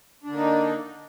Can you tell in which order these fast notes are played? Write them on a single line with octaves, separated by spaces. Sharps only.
D4 D3 A#3 D#4